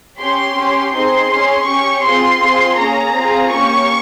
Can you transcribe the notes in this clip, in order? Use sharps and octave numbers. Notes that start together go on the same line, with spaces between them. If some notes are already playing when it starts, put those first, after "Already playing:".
C#4 G4 C6
C#4 G4
C4 D#4 G#4 C6
C#4 G#4
C#4 G4 C#6
C4 F4 G#4 C6
C4 F4 G#4
A#3 C#4 G#4 A#5
C4 F4 G#4
A#3 C#4 G4 C#6